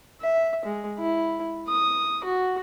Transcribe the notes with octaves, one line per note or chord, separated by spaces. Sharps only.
E5
G#3
E4
D#6
F#4